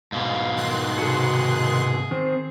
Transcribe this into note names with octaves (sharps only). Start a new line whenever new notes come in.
G#2 B2 F5
D#3 C6 F#6
C3 F#4 G#4
D#3 C4 C5